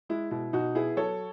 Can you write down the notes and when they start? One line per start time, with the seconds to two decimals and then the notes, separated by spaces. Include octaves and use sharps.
0.09 G#3 E4
0.31 B2 E4
0.53 B2 D#4 F#4
0.75 B3 E4 G#4
0.97 F#3 A4 C#5